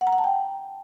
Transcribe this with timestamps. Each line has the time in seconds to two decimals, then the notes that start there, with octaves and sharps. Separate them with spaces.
0.01 F#5
0.07 A#5
0.13 F#5
0.18 A5
0.24 G5